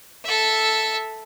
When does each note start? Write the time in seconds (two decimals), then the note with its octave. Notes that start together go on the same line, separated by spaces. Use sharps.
0.24 A4 E5